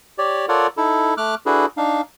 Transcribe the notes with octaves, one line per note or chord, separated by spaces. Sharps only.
G4 C#5 D5
F4 A4 A#4 C#5 D5 F#5
D#4 E4 A4
A3 D6 F6 F#6
D4 E4 F#4 G#4 A4 B4
D4 D#4 F5